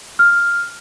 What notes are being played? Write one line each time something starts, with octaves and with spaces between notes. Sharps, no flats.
F6